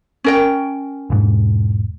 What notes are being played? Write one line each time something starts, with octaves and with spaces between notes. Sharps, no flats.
C#4 A#4 G5
E1 G#2